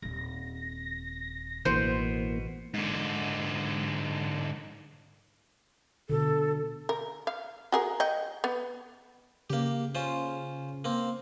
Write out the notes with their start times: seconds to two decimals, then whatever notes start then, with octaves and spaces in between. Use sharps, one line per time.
0.02 D#1 C4 A#6
1.65 A1 B2 E3 A#3 C5
2.74 G#2 D3
6.10 B2 D3 A4
6.89 A#4
7.27 F5
7.72 F#4 G#4 A#4
8.00 D#5 G5
8.44 B3
9.50 C#3 A#3 G4
9.95 C#4 F4 C5
10.84 A#3 C4